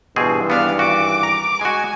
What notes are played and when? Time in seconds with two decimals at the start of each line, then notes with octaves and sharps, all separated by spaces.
0.16 G#1 G2 B2 E3 C4 G#4
0.50 B3 D4 F5
0.79 F#4 D6
1.23 A#5
1.61 G#3 F#4 G#5